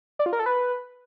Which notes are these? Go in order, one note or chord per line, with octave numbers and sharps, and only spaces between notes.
D5
F4
A#4
A4
B4